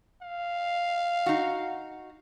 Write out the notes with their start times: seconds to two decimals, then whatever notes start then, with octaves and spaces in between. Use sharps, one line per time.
0.22 F5
1.26 D#4 F#4